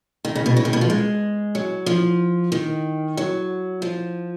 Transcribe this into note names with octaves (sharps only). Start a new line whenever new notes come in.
D#3
C#3
B2
C#3
D#3
B2
F3
G#3
F#3
F3
D#3
F#3
F3